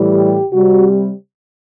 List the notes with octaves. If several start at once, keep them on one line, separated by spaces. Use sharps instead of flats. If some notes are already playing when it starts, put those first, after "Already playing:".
Already playing: A2 E3 G3
G4
C3 G3 F#4